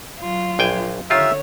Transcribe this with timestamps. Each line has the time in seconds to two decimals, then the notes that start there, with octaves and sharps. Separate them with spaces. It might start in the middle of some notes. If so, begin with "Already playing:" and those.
0.20 F#3 F4
0.59 A#1 G5 G#5
1.10 D3 D#3 F4 G4 C#5 E5